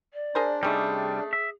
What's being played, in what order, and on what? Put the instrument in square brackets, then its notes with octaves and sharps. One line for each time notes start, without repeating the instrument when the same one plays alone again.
[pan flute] D5
[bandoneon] D4 [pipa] G#4 A#4 C5
[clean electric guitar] C3 G3 [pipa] A3 C#4 D#4 [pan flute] G#4
[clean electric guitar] E5